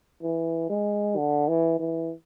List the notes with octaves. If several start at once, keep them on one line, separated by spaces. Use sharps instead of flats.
E3
G#3
D3
E3
E3